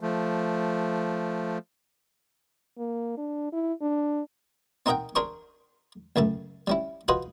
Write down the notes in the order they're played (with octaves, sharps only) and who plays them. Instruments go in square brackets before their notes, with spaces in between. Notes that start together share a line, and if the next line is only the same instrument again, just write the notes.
[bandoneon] F3 A3
[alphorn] A#3
D4
E4
D4
[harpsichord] C4 D#4 A#4 D#5 F#5 G5
D4 G#4 A#4 C5 C#6
C#2 F#2 A3 A4
G3 C#4 E4
F4 F#4 G#4 B4 C5 D#5